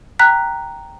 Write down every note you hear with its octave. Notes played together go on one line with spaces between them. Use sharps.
G5 A#5 F#6 B6